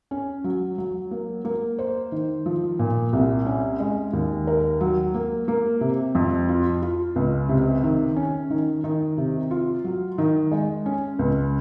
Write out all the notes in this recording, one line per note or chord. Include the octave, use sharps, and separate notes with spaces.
C#4
F#3
F#3
A#3
A#3
C5
D#3
F3
A#2
C2
C#4
G#3
D#2
A#4
F#3
A#3
A#3
C3
F2
F4
F4
C#2
C3
D#3
C#4
D#3
D#3
C3
F4
F#3
D#3
G#3
C#4
C#2